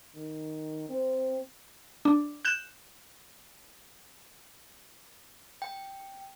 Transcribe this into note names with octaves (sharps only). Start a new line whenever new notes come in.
D#3
C4
D4
F#6 G6 E7
G5